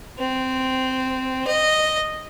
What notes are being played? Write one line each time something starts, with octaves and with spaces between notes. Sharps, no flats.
C4
D#5